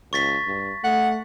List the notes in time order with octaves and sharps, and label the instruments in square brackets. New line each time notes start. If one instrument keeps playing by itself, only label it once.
[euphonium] C#2 [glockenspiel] C#6 A6 B6
[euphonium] G2
[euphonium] A3 [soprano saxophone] F#5